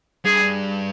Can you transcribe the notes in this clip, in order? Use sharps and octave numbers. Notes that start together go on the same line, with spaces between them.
G2 G#4